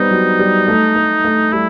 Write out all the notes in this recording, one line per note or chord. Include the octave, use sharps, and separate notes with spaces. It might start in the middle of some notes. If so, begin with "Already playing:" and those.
Already playing: G3 B3 C4 D#4
F#3
G3
A3
A3
A3
G3 E4